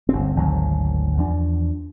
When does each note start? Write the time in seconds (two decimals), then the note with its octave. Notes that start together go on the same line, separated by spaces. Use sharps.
0.09 G1 D2 C4
0.36 G#1 D2 D#3 F#3
1.17 E2 F3 D4